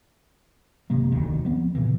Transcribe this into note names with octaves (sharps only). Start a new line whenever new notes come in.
F#1 C3 G#3 A#3
E1 D2 D#3
F3 B3 C4
A#2 C#3 E3